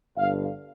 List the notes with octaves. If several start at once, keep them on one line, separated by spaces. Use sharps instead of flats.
G1 G2 D3 F5